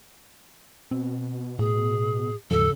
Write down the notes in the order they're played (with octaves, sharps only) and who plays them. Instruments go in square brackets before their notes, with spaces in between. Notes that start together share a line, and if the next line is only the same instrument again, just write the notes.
[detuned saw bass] B2 [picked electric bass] C4
[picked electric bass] A2 [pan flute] G#4
[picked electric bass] D#2 G#2 F3 [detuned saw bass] C#3 [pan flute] A4